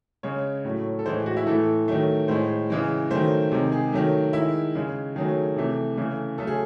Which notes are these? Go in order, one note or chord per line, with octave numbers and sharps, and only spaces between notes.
C#3 G#3 C#5
A2 F#3 A3
A4
A2 E3 G#3 C5
F#4
E4
A2 E3 A3 A4
D#3 F#3 A3
A2 G#3 C5
C#3 E3 G#3
D#3 F#3 A3 C5
C3 D#3 G#3
G#4
D#3 F#3 A3
D#3 G#3 E4
C#3 G#3
D#3 F#3 A3 G#4
C3 E3 A3
C#3 E3 A3
C#3 F#3 A3 A4
G#4